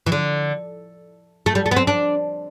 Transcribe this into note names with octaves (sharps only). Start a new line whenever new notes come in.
E3
D3
A3
G3
A3
B3
C4
D4